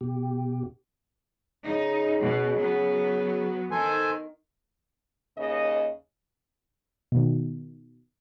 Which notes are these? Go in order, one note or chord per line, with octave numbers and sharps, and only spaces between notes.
B2 G4
C#3 D#4
B2
F#3 B3
D#3 A4 C5 G#5
D#2 C#3 D#5
B2 D#3